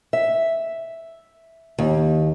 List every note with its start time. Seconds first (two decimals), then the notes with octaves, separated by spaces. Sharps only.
0.13 E5
1.79 D#2